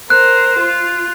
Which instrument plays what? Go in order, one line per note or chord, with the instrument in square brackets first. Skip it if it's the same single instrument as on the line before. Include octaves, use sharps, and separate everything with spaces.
[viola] A#4 C5 [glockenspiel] F#6
[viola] F4